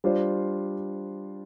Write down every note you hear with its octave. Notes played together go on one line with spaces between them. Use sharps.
G3 D4 F4 C5